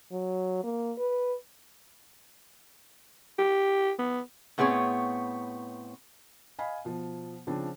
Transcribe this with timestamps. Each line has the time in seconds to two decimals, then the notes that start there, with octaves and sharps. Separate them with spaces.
0.12 F#3
0.64 A#3
0.98 B4
3.38 G4
3.99 B3
4.58 A2 B3 C4 G#4 C#5
6.59 D#5 F5 G#5 B5
6.85 B2 F3
7.47 C#3 F3 C4 D4